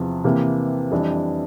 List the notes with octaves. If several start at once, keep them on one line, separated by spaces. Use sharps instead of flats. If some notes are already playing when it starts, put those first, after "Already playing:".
Already playing: E2 C3 F3
C3 E3 A#3
F2 E3 G3 D4